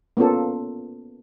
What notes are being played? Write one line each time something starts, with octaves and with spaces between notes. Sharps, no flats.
A#3 B3 C#4 F4 A4